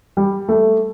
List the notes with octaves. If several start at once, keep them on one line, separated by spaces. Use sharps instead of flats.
G3
A3